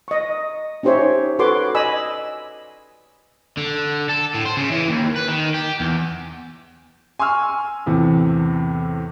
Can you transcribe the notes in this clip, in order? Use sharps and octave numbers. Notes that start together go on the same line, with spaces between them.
D#5 C#6
C#4 D#4 G4 C5 C#5 E5
F#4 A4 B4 C#5 C6 D6
D5 D#5 G#5 B5 E6
D3
A4
A2
C5
C#3
E3
D#2
B4
D#3
G4
E2
G#5 C6 C#6 E6 F6
E2 A2 C3